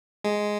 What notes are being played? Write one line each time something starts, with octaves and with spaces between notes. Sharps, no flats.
G#3